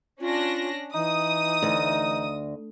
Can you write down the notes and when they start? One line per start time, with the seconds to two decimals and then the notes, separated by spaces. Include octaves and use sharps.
0.21 C#4 D4 F4 A#6
0.94 E3 D#4 D#6
1.62 D2